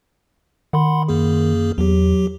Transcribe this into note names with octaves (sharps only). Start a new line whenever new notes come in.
D#3 F#5 B5 C6
F#2 A#3 G#4
E2 F#3 G4